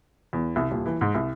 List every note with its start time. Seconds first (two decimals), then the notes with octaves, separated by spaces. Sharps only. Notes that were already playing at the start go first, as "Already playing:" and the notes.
0.33 E2
0.56 C2
0.71 D#1
0.85 E3
1.01 G#2
1.15 C2